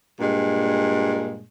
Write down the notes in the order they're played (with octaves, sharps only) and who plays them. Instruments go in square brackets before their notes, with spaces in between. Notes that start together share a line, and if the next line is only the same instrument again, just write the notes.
[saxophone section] G2 A#2 G#3